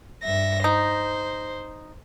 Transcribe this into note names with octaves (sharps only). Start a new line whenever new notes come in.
G2 E5 A#6
D#4 C5